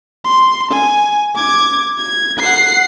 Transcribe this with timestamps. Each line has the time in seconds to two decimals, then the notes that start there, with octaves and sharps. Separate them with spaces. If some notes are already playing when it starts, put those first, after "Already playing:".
0.25 C6
0.71 G#5
1.35 D6 G#6
1.98 G#6
2.39 F#5 C7